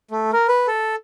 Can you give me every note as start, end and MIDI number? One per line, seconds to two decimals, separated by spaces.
0.11 0.31 57
0.33 0.47 70
0.48 0.67 71
0.67 0.95 69